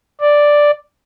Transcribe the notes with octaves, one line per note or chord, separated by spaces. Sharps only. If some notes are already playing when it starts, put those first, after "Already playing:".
D5